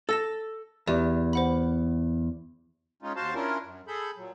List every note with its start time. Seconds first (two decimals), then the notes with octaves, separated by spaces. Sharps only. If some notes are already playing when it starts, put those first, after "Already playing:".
0.09 A4 E6 A#6 E7
0.87 E2 G4 D5
1.33 C5 F#5 B5
3.02 G#3 C#4 D#4 F4
3.16 D#2 F#4 C5 F5 A5
3.35 C#4 D4 E4 F4 A#4
3.64 F#2
3.88 G#4 A4 B5 G6
4.17 A#2 F#3